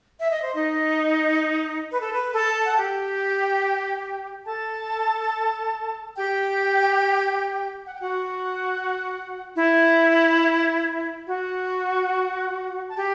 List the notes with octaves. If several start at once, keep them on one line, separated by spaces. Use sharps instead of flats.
E5
D#5
C5
D#4 D#5
B4
A4
B4
A4 A5
F#5
G4 G5
A4 A5
G4 G5
F#5
G5
F#4 F#5
E4 E5
F#4 F#5
A5
G4 G5